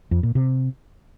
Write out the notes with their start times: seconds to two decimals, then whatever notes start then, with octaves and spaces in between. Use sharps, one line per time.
0.11 F2
0.23 A#2
0.35 C3